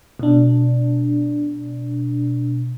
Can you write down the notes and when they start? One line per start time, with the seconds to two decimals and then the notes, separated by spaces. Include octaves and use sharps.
0.19 B2 D4